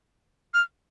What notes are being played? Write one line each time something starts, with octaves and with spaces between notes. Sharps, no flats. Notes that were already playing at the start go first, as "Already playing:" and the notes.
F6